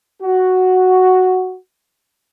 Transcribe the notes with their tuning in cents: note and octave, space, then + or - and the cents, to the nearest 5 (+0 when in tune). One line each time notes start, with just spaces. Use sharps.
F#4 +0